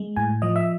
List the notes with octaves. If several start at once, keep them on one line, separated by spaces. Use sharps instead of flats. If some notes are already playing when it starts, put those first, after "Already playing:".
Already playing: G#3
A2 G#5
F3 D#5
E5